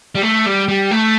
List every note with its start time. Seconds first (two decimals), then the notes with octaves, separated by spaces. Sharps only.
0.15 G3
0.22 A3
0.46 G3
0.68 G3
0.91 A3